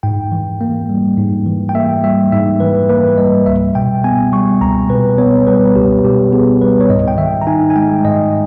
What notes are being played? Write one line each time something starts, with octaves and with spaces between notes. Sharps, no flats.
G#2 G5
E3
A#3
G3
G#2
E3
G5
A#3 E5
G3 E5
G#2 E5
E3 B4
A#3 B4
G3 D#5
C#2 E5
B2 G5
B3 G#5
G3 C#6
C#2 A#5
B2 B4
B3 C#5
G3 B4
C#2 G4
B2 G4
B3 G#4
G3 B4
C#5
G#2 D#5
G5
D#3 E5
A#5
D#4 G#5
G#5
G#3 G5
G#2 D#5